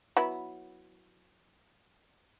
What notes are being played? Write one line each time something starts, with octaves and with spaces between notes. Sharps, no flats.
F#3 B3 E4